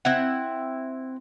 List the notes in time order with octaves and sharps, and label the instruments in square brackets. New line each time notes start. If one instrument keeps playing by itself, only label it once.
[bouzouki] C4 E4 F#5